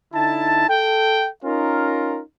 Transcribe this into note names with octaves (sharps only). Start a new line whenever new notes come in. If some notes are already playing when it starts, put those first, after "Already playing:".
D3 D#4 E4 A5
A4 G5
C#4 D#4 F4 A#4